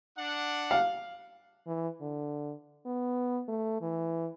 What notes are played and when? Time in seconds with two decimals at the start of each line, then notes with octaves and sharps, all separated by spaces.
0.17 D4 F#5
0.71 F5
1.67 E3
2.01 D3
2.86 B3
3.48 A3
3.81 E3